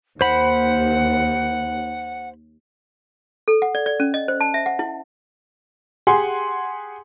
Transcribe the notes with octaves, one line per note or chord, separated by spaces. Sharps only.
D#2 C5 F#5 B5
A4
F#5
D5
D5
C#4
D#5
C5
A5
E5
F#5
E4
G4 G#4 F#5 G#5 C6